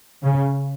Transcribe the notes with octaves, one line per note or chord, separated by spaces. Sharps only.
C#3